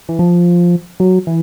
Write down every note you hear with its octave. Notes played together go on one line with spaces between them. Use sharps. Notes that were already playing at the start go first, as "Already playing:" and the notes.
E3
F3
F#3
E3